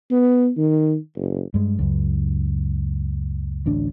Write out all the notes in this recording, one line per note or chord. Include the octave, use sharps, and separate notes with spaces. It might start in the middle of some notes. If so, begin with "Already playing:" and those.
B3
D#3
F#1
G2 G#3
C#2 F#2
A1 D2 D4